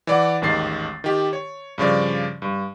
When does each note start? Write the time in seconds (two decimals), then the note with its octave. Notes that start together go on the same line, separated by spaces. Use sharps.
0.07 E3 D5 F#5
0.41 A1 D#2 G#2 D#3 A6 C7
1.04 D#3 G4
1.33 C#5
1.78 G2 C#3 F3 D5
2.42 G2